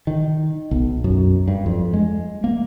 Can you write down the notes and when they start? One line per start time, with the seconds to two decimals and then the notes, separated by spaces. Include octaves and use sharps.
0.07 D#3
0.71 B1
1.04 F#2
1.48 G2
1.66 F2
1.94 G#3
2.44 A#3